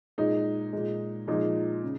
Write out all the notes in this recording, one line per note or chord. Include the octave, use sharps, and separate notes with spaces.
A#2 G#3 D#4
A#2 G#3
A#2 F3 G#3 D#4
C#3